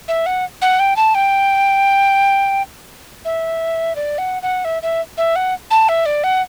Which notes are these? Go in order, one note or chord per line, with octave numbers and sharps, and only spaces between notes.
E5
F#5
F#5
G5
A5
G5
E5
D5
F#5
F#5
E5
E5
E5
F#5
A5
E5
D5
F#5